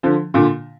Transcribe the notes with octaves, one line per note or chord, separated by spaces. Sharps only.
D3 F3
A#2 D3